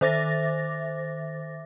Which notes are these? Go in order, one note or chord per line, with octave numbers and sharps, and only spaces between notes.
D#3 C5 E5 D6 A6 A#6